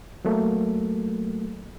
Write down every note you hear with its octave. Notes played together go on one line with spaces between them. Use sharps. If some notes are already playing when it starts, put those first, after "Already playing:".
F#3 A3 A#3